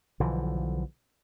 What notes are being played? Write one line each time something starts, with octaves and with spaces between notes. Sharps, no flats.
B1 D3 E3 F3